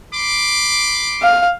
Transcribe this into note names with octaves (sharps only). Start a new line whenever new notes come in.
B5 C6 D6
F5